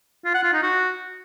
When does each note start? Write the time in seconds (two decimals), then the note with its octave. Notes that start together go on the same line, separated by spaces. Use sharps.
0.25 F4
0.34 F#5
0.44 F4
0.53 D#4
0.62 F#4